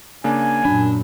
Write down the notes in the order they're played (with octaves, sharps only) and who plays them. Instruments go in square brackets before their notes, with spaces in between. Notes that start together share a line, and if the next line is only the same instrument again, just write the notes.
[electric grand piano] C#3 A#3 D4 [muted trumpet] G#5
[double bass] F#2 A#2 [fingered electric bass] D4 [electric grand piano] B5